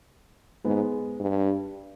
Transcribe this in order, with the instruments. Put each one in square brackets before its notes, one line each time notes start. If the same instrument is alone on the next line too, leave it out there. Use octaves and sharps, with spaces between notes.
[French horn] G#2 [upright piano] G#3 B3
[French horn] G2